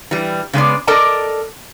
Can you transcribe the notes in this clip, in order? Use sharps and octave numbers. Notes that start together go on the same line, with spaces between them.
E3 G3
C#3 G#3 B3 D5
A4 A#4 D5 D#5 A5